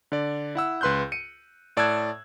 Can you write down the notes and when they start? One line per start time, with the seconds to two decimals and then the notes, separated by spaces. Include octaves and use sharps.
0.12 D3 D5
0.55 E4 F#5 E6
0.81 C#2 B4 C6 F#6 G6
1.12 C#7 D#7
1.77 A2 D5 A5 E6 F#6 G#6